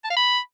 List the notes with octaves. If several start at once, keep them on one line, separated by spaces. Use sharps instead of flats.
A5
F5
B5